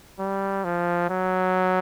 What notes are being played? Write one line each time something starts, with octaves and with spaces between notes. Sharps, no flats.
G3
F3
F#3